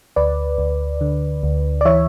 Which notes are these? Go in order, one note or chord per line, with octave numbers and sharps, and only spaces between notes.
D2 B4 D5
D2
D3
D2
D5
E3 C#5 E5